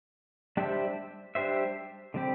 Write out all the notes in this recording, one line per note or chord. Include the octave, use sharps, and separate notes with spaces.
G3 D4 G4 C5 E5
G3 D4 G4 C5 E5
D3 G3 C4 G4